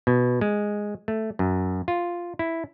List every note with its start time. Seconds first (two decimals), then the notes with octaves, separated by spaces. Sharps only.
0.07 B2
0.41 G#3
1.08 A3
1.39 F#2
1.88 F4
2.39 E4